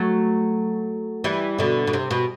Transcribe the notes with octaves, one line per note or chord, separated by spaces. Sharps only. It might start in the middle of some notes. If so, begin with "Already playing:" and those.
Already playing: F#3 A3
E3 G3
B2 D3
B2
C3
B2